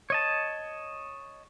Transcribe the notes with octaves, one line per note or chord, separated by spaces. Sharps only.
C#5 D#5 A5